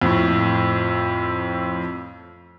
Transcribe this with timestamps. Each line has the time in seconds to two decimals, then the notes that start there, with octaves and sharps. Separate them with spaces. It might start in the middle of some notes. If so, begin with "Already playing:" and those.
0.02 F2 A2